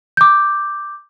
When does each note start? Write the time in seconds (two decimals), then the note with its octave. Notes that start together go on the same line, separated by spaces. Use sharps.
0.17 D6 G6